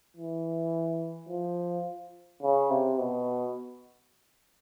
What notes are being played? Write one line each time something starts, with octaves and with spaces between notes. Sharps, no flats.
E3
F3
C#3
C3
B2